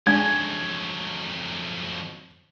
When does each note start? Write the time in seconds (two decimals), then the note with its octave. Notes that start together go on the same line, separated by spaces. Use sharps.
0.07 F2 F#3 G#3 D4 G#5 G#6